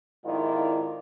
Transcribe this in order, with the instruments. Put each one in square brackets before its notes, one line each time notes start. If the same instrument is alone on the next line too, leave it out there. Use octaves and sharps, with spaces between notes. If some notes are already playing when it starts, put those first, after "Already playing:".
[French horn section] F2 G#2 D#3 E4 F4 D5